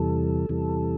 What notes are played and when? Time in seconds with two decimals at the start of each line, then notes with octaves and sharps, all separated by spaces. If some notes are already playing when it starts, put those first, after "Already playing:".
Already playing: E2 C3 E3 G3 A4
0.49 E2 C3 E3 G3